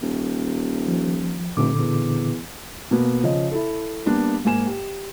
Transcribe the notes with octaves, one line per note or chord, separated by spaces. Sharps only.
D#1
F3
F1 A#2 D3 D6
E2
B2 A#3 B3
C#3 F3 D#5
E4 A4
G3 A#3 B3 D4
G#2 A#3 G#5 E7
G4